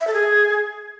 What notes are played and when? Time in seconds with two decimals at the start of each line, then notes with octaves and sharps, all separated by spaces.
0.01 E5
0.07 A4
0.14 G#4